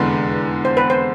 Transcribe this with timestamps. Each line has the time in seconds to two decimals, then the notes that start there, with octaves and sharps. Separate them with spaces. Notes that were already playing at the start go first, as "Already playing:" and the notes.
Already playing: F1 E2 D3 G#3 B4
0.65 C5
0.77 B4
0.90 C5